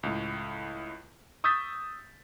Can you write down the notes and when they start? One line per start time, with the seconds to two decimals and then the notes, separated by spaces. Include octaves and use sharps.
0.03 C#2 A2
1.44 C#6 D#6 E6 G6 A6 B6